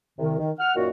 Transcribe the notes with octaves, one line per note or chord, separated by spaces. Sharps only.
C2 C3 D#3
D#3
F#5 F6
F#2 A#2 D#3 A#3 F#4